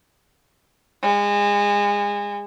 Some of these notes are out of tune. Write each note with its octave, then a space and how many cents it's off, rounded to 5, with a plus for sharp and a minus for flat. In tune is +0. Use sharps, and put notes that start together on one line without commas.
G#3 -30